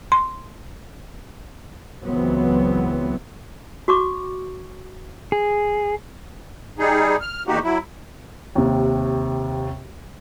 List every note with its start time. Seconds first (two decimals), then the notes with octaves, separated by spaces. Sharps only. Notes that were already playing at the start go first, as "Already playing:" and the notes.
0.12 C6
2.03 C#2 E3 F#3 B3 C4
3.88 F#4 C#6 D6
5.32 G#4
6.79 G3 D#4 G#4
7.21 F6
7.47 E2 A#3 D#4 F#4 G4
7.63 F#3 E4
8.55 D#2 C3